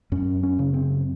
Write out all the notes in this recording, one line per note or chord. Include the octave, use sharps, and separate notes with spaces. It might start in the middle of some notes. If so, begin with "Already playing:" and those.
F#2 C#4
C#4
C#3
C4